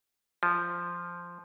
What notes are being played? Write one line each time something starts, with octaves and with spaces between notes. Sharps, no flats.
F3